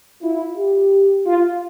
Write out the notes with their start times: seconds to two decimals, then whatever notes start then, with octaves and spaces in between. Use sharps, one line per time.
0.22 E4 F4
0.57 G4
1.27 F4